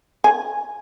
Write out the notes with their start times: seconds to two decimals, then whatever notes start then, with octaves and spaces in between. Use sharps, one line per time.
0.24 G#5